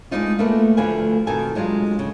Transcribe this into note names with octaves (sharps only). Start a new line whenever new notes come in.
G#3 B3 C4 D4 D#4 F4
A3 A#3 F4 G#4 A4 B4
D2 D3 F3 B4 F5 G#5
F2 B2 D#3 D#4 A4 G#5
F#3 G#3 D4 F4
C#3